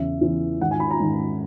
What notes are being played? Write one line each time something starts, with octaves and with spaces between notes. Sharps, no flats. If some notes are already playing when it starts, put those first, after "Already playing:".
Already playing: E2 C#3 E3 E5
E2 C#3 E3
G#2 D#3 F#5
G#5
B5
A#5
G#2 D#3